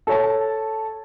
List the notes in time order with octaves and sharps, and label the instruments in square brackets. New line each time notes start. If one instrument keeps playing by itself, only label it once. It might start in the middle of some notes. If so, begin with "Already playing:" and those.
[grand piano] A4 C#5 A5